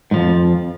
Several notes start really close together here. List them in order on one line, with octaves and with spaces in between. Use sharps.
G#2 F3 F2